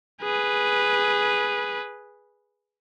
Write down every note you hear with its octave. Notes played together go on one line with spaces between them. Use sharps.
G#4 B4